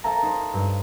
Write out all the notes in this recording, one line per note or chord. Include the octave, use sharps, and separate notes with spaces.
A4 C5 E5 F5 A5 A#5
D#4 C5
G2